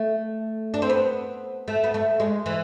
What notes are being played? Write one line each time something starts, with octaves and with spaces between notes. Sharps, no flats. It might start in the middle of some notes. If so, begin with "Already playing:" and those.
Already playing: A3
D4
C4
B3
A3
B3
A3
G#3
E3